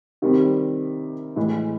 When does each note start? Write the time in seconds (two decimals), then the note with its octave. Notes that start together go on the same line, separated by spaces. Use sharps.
0.22 C3 D#3 G3 C4
1.36 A2 E3 G#3